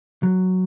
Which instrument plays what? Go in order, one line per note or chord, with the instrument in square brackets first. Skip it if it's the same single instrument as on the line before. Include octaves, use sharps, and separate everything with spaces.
[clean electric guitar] F#3